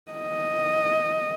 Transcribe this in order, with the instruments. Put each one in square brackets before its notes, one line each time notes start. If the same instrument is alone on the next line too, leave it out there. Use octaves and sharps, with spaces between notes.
[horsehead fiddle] D#5